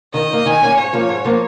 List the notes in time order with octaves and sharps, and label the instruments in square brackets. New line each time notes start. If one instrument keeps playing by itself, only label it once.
[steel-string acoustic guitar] D#3 [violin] D#5
[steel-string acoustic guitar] A#3 D#4
[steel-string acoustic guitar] D#3 [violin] G#5
[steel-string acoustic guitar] A#3 C#4
[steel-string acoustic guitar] G#2 [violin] C#5
[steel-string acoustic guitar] F3 A#3 C#4
G#2
F3 A#3